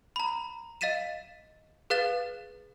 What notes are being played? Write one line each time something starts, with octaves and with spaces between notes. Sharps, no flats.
A#5 B5
D#5 F5 A6 B6 D#7 E7
G#4 B4 F5 F#6 A6 E7